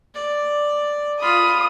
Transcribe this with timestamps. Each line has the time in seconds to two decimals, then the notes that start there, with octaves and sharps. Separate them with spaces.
0.15 D5
1.21 F4 B5 D#6